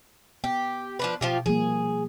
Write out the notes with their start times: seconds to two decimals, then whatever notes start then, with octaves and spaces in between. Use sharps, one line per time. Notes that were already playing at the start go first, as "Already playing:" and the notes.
0.44 B3 G4
0.99 F3 D4 B4
1.21 B2 F3 F4 G4
1.46 F3 G3 A#3 G#4